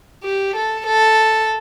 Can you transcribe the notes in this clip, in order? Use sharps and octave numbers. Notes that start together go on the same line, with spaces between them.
G4
A4
A4